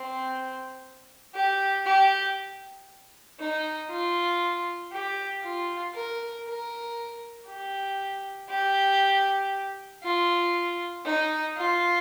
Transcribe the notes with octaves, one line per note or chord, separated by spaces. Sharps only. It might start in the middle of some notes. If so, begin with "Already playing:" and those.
Already playing: C4
G4
G4
D#4
F4
G4
F4
A#4
A#4
G4
G4
F4
D#4
F4